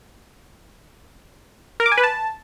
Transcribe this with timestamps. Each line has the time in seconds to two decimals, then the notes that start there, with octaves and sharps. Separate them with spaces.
1.80 A#4
1.86 D6
1.92 G#5
1.98 B4
2.03 A5